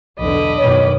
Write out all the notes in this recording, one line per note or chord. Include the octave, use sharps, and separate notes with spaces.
B1 E2 D3 D#5 B5 D6
F#2 B2 D#3 C#5